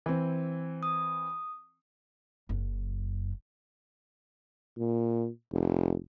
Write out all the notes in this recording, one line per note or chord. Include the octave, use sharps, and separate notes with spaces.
E3 C4
D#6
F#1 F#2
A#2
F1